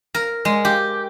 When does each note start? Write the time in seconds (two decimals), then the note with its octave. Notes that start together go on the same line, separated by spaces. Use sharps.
0.14 A#4
0.45 G#3
0.65 G4